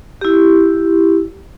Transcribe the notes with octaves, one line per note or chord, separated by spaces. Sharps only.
E4 G4